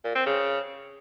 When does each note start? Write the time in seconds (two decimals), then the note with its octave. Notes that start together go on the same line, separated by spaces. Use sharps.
0.04 A#2
0.15 C4
0.26 C#3